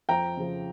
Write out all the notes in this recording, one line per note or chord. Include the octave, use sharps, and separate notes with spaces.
F2 G5 A#5
C#3 F3